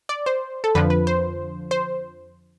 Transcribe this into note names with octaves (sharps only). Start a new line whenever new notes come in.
D5
C5
A4
F2 D3 F3 B4
B4
C5
C5